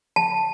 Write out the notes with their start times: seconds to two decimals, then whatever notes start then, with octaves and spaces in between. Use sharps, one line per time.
0.16 A5